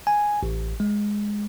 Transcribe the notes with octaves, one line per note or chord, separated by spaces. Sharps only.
G#5
A1
G#3